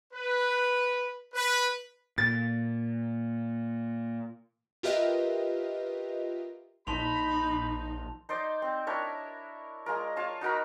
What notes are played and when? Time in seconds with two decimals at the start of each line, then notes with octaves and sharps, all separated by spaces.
0.13 B4
1.34 B4
2.18 A#2 A6
4.83 F4 G4 A#4 B4 D#5 E5
6.87 A#1 D#4 A5 B5 C6 F7
8.29 D#4 C5 D5
8.62 C4
8.87 D4 E4 A#4 C#5
9.86 G#3 F4 A#4
10.16 F4 C#5 A5
10.41 D#4 F#4 A#4 B5